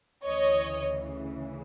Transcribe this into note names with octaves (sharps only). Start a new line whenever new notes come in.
D2 C#3 E3 C#5 D#5